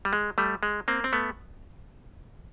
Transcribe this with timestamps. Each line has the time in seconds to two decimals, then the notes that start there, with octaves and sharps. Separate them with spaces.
0.05 G3
0.13 G#3
0.38 G3 A3
0.63 G#3
0.88 A#3 C4
1.04 C4
1.13 A3 B3